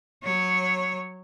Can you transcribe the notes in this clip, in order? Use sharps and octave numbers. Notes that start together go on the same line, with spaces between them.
F#3 C#5